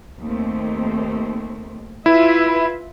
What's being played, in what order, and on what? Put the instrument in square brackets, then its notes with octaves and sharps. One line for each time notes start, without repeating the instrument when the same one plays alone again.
[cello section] D#2 A3 C4
[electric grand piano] E4 [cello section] F4 B4 E5